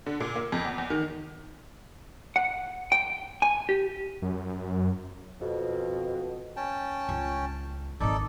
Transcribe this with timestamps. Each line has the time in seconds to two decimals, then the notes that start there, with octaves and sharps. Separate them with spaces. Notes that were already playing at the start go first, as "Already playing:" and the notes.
0.06 D3
0.20 A#2
0.36 A#3
0.52 F2
0.65 E2
0.78 E2
0.90 D#3
2.36 F#5
2.92 G5
3.42 G#5
3.69 G4
4.22 F#2
5.41 F2 B2
6.56 C#4 G5 A5
7.09 C#2
8.00 G#1 C4 D#4 A4 D5